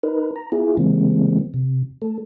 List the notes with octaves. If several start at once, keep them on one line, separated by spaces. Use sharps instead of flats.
D#4 A#4 B4
A#5
B3 E4 F4 G#4
C#3 E3 G3 G#3 A#3 C4
C3
A3 A4